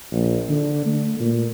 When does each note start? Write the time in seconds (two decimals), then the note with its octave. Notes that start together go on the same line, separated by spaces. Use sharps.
0.12 A#1
0.49 D3
0.85 A3
1.19 A#2